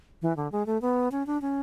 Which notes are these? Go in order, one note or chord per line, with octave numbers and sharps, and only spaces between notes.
E3
D3
G#3
A3
B3
C#4
D4
C#4